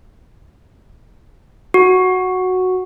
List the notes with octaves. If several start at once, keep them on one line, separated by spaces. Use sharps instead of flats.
F#4